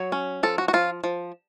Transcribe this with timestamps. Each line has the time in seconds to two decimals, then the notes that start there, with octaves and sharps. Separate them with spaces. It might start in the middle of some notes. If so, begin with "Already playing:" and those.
Already playing: F#3 C#5
0.12 C#4
0.43 F3 A4
0.58 F#4
0.68 F#4
0.73 F3 F4
1.04 F3